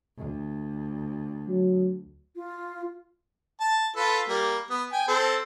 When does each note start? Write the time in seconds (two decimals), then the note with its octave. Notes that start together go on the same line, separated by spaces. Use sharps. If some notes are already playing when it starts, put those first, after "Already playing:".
0.18 D2
1.48 F#3
2.36 F4
3.60 A5
3.96 F4 A4 B4
4.28 G3 A#3
4.70 B3
4.92 G5 G#5
5.08 C4 A4 C5